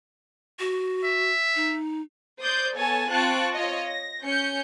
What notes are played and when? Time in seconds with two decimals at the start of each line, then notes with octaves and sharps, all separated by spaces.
0.60 F#4
1.05 E5
1.56 D#4
2.39 C5 D5 D#6 G6
2.75 B3 A4 C#5 G#5 A5
3.09 C4 F4 A5 C#6 F#6 D7
3.53 F4 C#5 D#5
3.85 A#6
4.23 C#4 G6 C#7